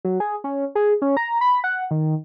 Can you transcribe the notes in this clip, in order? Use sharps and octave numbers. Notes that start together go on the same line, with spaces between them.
F#3
G#4
C#4
G#4
C#4
A#5
B5
F#5
D#3